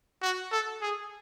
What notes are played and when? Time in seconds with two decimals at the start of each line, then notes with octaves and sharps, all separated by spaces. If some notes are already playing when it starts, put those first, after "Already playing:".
0.22 F#4
0.51 A4
0.81 G#4